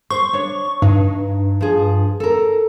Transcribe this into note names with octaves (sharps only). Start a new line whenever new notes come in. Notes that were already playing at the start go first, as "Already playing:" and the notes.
C5 C#6
D4 C#5
G2 D#4
F3 G#4
A4 A#4